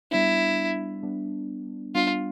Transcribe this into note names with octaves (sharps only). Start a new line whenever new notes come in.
G3 B3 D4 E4
G3 B3 D4
G3 B3 D4 F4